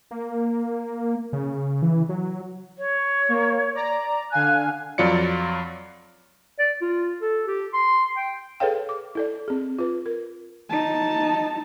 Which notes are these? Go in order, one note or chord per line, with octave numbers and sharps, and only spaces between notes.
A#3
C#3
E3
F#3
C#5
A#3
D5 A#5
D3 F5 G#5 F#6
F2 F#3 F4 D5 C#7
D5
F4
A4
G4
C6
G5
G#4 A4 B4 C#5 F5 G5
D6
E4 A4 D5
C4 G#4
F4 B4
A#4
D#4 A5